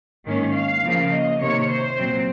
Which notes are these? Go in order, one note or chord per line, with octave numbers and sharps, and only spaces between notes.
G#2 D#3 A#3 C#4
F5
C#3 F3 A#3
D#5
C3 D#3 A#3 C#5
C5
A#2 F#3 C4